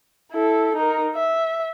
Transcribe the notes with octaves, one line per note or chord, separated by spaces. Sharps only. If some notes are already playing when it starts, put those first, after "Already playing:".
E4 A4
D#4 A#4
E5